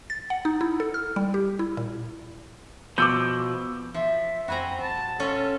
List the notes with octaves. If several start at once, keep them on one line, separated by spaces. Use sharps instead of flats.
A6
F#5
D#4
E4
A4
F6
G3
G4
E4
A#2
B2 F3 D6 E6 G6
F3 E5
F2 C4 F#4 G#5 A#5 B5
D#1 A5 A6
C#4 F4 A4